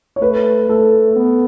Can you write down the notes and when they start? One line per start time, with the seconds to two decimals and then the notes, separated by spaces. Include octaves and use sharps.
0.16 C#5
0.21 A3 B4
0.69 A3 A4
1.16 B3